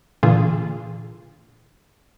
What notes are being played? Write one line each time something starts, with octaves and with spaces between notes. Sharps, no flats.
A#2 D3 E3 F4 G#4 A4